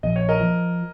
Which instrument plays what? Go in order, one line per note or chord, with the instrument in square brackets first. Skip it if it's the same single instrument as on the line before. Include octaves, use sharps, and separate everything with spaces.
[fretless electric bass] A#1 [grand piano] D#5
[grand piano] C#5
A#4 D#5
[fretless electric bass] F3